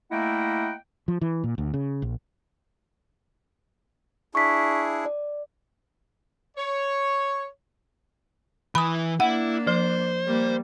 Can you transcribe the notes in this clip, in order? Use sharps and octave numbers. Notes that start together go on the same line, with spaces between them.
A3 A#3 E4 D#5 F#5 G5
F3
E3
A#2
D2
C#3
A#1
D4 E4 G#4 C#6 B6
D5
C#5
E3 B4 B5 D#6
A#3 D4 E4 F#5
F3 C5
G3 A#3